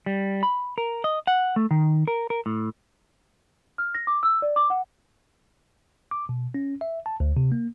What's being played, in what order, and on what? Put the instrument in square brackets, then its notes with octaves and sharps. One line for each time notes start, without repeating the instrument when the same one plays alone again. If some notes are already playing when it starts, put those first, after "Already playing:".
[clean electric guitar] G3
B5
A#4
D#5
F#5
A3
D#3
A#4
A#4
A2
[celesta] F6
A#6
D6
E6
D5
D6
F#5
[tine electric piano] D6
B2
C#4
E5
A5
D2
C3
A#3